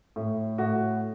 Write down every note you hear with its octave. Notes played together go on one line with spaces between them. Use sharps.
A2
A2 F#4